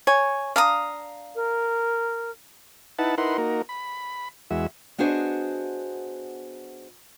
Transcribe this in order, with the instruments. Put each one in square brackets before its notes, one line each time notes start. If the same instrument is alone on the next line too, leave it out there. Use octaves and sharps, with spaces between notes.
[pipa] C#5 [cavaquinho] G#5
[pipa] D4 [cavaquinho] F5 A#5 D#6
[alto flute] A#4
[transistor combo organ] D#4 E4 B4 F#5 A5
D#4 E4 A#4 B4 F#5 C6
A#3 D#4 F#4 A#4
B5
E2 G#3 F#4 E5
[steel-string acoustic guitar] B3 D4 F#4 G#4 C5 D#5